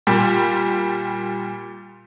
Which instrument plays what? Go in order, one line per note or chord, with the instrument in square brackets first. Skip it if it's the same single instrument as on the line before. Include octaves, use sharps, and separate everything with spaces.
[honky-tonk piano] A#2 G3